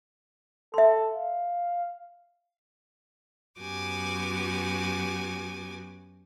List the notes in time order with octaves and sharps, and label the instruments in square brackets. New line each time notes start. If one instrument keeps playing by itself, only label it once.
[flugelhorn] A4 [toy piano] E5 C6
[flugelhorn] F5
[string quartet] F#2 B3 F#4 G4 G#5 D6